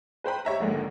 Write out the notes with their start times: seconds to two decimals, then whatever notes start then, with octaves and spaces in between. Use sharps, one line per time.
0.24 B4 C5 G5 B5
0.45 G4 C#5 E5 A#5
0.60 A#1 G#2 D3 D#3 G#3 A#3